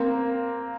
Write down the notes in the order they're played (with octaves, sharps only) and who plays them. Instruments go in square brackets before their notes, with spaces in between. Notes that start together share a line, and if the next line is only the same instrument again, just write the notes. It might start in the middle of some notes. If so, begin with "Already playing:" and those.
Already playing: [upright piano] A#3 C4